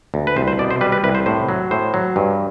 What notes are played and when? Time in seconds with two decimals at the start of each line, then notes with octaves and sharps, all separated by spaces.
0.14 D2
0.27 B4
0.36 C2 C5
0.48 C5
0.59 B2 D5
0.70 C5
0.81 G3 B4
0.92 B4
1.04 C2 B4
1.15 C5
1.26 A2 C5
1.49 F#3
1.71 A2 C5
1.94 F#3
2.16 G2